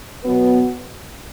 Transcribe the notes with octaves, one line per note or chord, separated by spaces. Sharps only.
B2 F#3 B3 B4